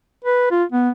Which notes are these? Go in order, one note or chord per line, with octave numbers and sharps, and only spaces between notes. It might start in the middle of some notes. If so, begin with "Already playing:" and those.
B4
F4
B3